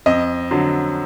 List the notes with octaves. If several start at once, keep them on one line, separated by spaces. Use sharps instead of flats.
F2 D#5
D3 F#3